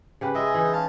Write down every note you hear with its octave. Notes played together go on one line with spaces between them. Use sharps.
C#3 G4 B4
G#3 G#4 D#5 E5
E3 D#4
C#4 F5 A5